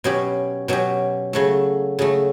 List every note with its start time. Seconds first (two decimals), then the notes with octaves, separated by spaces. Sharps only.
0.04 B2 F#3 C#4 G4
0.68 B2 F#3 C#4 G4
1.33 C#3 F#3 A3
1.99 C#3 F#3 A3